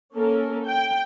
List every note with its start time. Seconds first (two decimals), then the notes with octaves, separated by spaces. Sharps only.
0.13 A#3 C#4 A4 A#4
0.65 G5